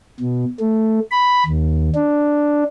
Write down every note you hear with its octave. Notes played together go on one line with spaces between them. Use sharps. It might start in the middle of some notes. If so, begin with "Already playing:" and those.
B2
A3
B5
D#2
D4